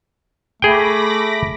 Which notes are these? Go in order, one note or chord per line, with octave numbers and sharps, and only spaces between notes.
A3 G#4 G5 B5 D6 A#6